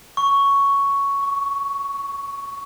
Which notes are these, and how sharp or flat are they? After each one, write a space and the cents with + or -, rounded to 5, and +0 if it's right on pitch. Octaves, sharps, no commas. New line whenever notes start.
C#6 +5
C#6 +35